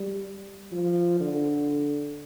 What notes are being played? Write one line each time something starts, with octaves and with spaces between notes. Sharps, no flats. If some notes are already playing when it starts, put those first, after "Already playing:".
Already playing: G3
F3
D3